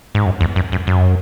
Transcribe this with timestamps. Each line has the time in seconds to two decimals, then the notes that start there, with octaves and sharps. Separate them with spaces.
0.15 G#2
0.26 F#2
0.41 E2
0.56 F#2
0.72 F#2
0.87 F#2